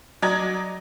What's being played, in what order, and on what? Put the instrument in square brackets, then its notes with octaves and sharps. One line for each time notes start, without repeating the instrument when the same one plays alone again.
[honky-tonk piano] F#3 D5 D#5 A#5 G#6 A#6